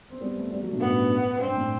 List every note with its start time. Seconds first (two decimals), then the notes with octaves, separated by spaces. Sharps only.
0.10 C4
0.21 G3 B3
0.36 A3 C4
0.51 G3 B3
0.61 F#3 A3
0.71 G2 B2
0.81 F#2 A2 B3
0.97 G2
1.41 G2 C4
1.56 A2